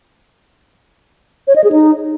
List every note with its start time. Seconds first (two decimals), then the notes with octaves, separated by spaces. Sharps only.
1.47 C#5
1.56 D#5
1.64 G#4
1.72 D#4